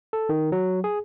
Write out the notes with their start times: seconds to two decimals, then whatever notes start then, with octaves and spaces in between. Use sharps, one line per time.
0.13 A4
0.29 D#3
0.52 F#3
0.84 G#4